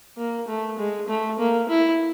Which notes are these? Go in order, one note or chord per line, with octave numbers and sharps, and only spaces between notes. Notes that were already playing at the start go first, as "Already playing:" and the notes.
A#3
A3
G#3
A3
A#3
E4